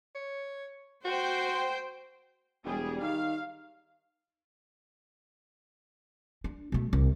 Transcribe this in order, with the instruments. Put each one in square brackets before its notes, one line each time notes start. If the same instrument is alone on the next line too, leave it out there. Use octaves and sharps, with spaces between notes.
[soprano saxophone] C#5
[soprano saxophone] F#4 [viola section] C5 G5
[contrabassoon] E1 [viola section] G3 G#4
[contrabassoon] D#3 [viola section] F5
[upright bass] D4
B2 A3
C2